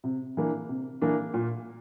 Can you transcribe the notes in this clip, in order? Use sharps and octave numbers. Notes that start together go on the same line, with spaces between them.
C3
E3 A#3 D4
C3
E3 A#3 D4
A#2